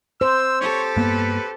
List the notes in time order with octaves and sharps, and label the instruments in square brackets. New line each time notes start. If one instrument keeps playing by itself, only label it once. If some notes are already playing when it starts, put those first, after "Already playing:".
[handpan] C5 [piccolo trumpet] E6
[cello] G4 A4 [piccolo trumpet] C#5
[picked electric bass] G2 A#3 B3 [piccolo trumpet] B4